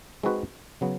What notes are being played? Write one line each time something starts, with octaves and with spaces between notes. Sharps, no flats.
G#3 C4 D#4 F#4 B4
C#3 F#3 B3